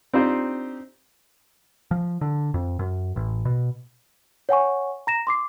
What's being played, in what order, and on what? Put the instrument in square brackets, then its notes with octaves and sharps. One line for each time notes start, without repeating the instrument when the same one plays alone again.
[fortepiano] C4 D4 D#4 F4 G4 C5
[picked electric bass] F3
D3
F2
F#2
A1
B2
[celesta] C#5 F#5 G#5 C#6
A#5 A#6 E7
C6 D6 C7